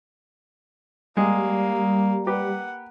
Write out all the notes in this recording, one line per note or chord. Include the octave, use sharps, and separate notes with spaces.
G3 G#3 A#3
G4 B4 F#5